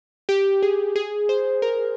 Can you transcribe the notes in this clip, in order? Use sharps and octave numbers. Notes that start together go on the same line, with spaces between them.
G4
G#4
G#4
C5
A#4